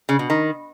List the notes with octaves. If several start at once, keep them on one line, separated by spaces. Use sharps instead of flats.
C#3
B2
D#3